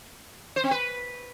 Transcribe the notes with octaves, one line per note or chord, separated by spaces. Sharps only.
C5
C4
B4